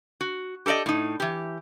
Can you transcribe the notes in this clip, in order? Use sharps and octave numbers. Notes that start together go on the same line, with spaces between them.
F#4
G4 A4 A#4 D5 D#5
A2 D#4
E3 G4